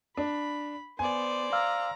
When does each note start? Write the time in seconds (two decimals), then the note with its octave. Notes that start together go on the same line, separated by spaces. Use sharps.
0.17 D4 B5
0.99 B3 C5 D5 G#5
1.53 F5 A#5 E6 F6